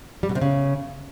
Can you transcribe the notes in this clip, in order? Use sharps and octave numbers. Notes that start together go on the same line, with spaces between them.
G3
B2
C3
C#3